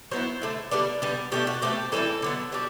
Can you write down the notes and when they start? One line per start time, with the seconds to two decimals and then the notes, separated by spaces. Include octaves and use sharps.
0.11 F#3 B3 E4 C5
0.42 D3 A3 E4
0.71 D3 G3 B3 D4 D5
1.02 D3 G3 B3
1.32 B2 A3 D4 G4
1.47 F#4
1.62 B2 A3 C4 G4
1.92 E3 G3 C4 E4 A4
2.22 D3 F#3 B3
2.52 B2 G3 D4